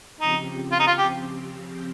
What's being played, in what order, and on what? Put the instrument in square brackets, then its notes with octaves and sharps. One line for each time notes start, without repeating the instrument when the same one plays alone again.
[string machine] C#3 F3 C4 G4 [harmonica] D#4
[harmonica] F4
D#4
F4
G4